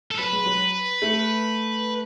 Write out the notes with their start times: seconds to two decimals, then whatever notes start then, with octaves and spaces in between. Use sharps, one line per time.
0.11 A4
0.19 F#3 B4
0.33 G#3
0.46 F#3
1.02 A3